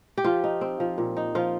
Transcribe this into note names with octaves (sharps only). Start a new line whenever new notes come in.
G4
F3 F4
D#4
C4
F3
A#2
D#4
F3 F4